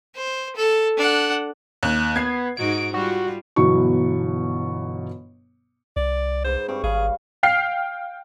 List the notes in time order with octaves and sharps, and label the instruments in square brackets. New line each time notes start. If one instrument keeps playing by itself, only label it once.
[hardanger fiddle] C5
A4
D4 F#5
[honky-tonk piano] D#2 [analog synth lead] F#6
[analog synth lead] B3 [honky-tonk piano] G#6 C7
[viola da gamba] G#2 D#4 F#4 [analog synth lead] D7
[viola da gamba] G3 F4 [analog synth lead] F#4
[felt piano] G1 B2 E3 F#3 C#6
[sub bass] C2 [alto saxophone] D5
[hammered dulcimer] G#2 B4 [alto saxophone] C5
[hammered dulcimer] G2 C#6 [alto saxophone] C4
[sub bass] G#1 [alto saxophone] G#4 [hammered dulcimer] C#5 F5
[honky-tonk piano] F5 G5 F6 C7